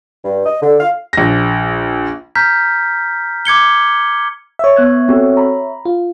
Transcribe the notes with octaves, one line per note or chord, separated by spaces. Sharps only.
G2
D#5
D3
F5
A#1 A#6
A#5 F6 G6 B6
D6 G#6 C#7 G7
C#5 E5
B3 F#6 G#6
C4 F#4 A4
A#5 B5
F4